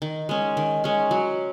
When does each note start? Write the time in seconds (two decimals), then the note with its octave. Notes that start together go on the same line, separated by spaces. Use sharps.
0.02 D#3
0.29 G#3 C#4
0.57 D#3
0.84 G#3 C#4
1.11 F#3